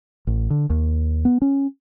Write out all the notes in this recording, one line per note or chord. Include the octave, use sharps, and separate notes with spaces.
A1
D3
D#2
B3
C#4